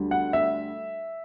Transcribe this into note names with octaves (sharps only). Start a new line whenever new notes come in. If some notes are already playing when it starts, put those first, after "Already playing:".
Already playing: D2 D3 G3
F#5
E5